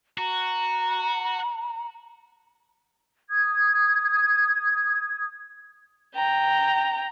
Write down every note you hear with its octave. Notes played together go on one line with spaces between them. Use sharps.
F#4 A#5
D#6 G#6
G5 A#5